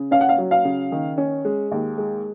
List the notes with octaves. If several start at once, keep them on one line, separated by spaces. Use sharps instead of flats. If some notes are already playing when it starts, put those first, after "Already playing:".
Already playing: C#3
C#4 F5
F#5
F5
F#3
F5
C#3
D#3
C#4
G#3
D#2
G#3